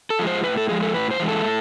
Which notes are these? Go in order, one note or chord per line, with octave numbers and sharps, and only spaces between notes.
A4
F3 G#3
C5
A2 B4
A4
F3 G#3 G#4
A4
A2 B4
C5
E3 G#3
A4
A2